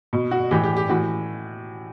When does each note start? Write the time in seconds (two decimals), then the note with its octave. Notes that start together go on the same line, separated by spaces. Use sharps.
0.13 B2
0.31 F#4
0.51 A2 E3 G4
0.64 G4
0.77 G4
0.89 A2 E3 F#4